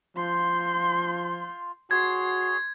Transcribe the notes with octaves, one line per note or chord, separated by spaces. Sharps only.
F3 F4 C6 G6
F#4 G#4 C#5 C6 G#6